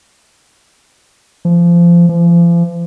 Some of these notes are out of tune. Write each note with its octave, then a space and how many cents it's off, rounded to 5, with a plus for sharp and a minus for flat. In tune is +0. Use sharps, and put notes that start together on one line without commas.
F3 -25
F3 -40